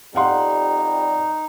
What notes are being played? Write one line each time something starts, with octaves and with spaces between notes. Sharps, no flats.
F2 G3 D#4 F5 F#5 C6